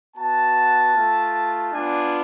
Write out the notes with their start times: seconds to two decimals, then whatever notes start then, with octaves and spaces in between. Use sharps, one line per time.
0.16 B3 F#4 A5
0.95 A3 F4
1.73 B3 D4 F4 G#5